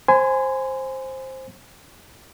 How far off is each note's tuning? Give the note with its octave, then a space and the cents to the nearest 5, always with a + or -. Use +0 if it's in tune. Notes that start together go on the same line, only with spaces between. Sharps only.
C5 +10 G#5 +0 C6 -45